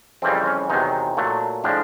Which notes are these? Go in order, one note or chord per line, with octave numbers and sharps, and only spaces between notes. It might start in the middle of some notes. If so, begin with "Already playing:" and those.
F2 C#3 E3 G3 C4
C#4
E2 C3 D#3 F#3 D#4
A#2 F#3 A3
A2 F3 G#3 D4